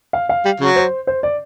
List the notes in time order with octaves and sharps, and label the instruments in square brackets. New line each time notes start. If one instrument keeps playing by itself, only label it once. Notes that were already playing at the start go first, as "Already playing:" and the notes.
[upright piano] F5
F5
[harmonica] G3
C#3 F#3
[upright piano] C5
C5
D5